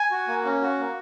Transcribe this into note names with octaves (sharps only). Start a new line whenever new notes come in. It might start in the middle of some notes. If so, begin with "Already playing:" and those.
Already playing: G#5
F#4
A#3
C#4
F#4
A#3